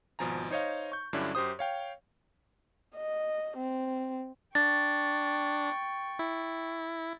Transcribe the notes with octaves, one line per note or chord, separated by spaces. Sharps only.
G#1 B2 F3 G#5 A#5
D#4 C5 C#5 D#5 F5
C#6 G6
G2 D3 F#3 C#4 D4 E4
F#2 G4 C5 D#6
C#5 F5 G5
D#5
C4
D4 G5 C#6 A6
E4